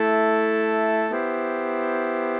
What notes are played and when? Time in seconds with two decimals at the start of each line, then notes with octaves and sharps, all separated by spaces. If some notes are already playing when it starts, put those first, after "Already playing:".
Already playing: A3 E4 A4
1.10 B3 E4 G4 C5